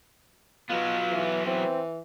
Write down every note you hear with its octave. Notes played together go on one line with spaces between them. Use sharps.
B2 F#3 B3 F4
E3
E3 C4